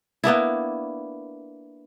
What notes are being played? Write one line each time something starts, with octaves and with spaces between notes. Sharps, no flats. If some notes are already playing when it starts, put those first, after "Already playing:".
A#3 B3 D4 E4